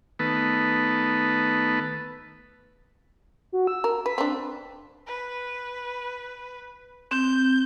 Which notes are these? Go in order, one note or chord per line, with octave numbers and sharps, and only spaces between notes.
D#3 A3 B3 B4 A5
F#4
E6
A#4
B4 B6
C4 D4
B4
C4 G6